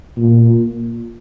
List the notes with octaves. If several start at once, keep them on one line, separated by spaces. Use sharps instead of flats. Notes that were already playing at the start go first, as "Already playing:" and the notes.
A#2